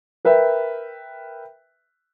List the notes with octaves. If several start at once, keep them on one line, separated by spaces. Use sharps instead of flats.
A#4 B4 E5 G5